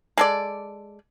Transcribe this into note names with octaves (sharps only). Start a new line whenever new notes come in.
G#3 A4 D5